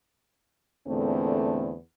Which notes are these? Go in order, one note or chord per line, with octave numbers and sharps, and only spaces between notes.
E2 A#2 D3 A3 C4